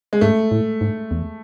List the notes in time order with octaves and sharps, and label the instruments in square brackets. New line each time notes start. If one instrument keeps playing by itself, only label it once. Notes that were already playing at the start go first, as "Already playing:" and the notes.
[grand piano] G#3
[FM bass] G#2 [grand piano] A3
[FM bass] A2
G#2
E2